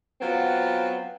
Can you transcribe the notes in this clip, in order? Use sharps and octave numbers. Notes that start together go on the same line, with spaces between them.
F#3 B3 C4 F4